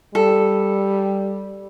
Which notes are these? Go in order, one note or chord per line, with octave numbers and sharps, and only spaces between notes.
G3 A4